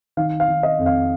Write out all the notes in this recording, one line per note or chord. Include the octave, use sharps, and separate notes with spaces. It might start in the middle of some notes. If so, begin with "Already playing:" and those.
D#3 F5
F5
D#3
D#5
F2
F5